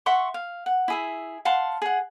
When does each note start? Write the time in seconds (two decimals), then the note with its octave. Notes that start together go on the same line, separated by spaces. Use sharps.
0.06 E5 F#5 C6 C#6
0.34 F5
0.66 F#5
0.88 E4 G#4 E5
1.45 F5 F#5 A5 C6
1.82 G#4 F#5